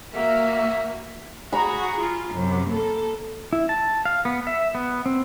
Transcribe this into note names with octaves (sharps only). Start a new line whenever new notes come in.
A#3 F#4 E5
F#4 G#4 A#5 B5
F4
F#2 C3
A#3 A4
E4
A5
F5
B3
E5
B3
C4